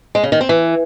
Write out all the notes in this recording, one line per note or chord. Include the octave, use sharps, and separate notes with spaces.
G#3
C#3
D#3
C4
E3